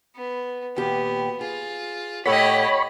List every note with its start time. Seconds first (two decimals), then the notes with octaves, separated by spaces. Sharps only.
0.16 B3
0.76 D#2 A#2 B3 G4
1.41 F4 G#4
2.26 A2 G4 A4 C#5 D#5 F#5 B5